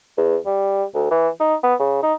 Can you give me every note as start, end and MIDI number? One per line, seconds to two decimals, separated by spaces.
0.17 0.36 40
0.46 0.84 55
0.94 1.08 38
1.11 1.29 52
1.40 1.55 63
1.63 1.75 59
1.79 1.99 49
2.03 2.13 63